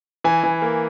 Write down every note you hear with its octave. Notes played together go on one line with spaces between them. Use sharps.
E3 G#5
E3
A#3